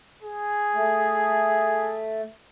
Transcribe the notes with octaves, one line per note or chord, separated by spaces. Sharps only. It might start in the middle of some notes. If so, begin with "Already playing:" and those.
G#4
A3